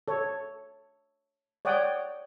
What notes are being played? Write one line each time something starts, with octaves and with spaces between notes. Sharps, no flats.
A4 C#5
C#5 D5 F#5 G5 D#6